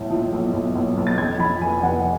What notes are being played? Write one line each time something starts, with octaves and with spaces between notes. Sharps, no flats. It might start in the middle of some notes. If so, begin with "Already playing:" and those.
Already playing: B1 A2
F3
B1
B1
B1
B1
A6
F2 G#6
F2 B5
F1 G#5
F1 F#5